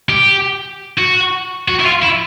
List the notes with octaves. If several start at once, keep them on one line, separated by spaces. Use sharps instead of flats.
G4
F#4
F#4
E4
F4
E4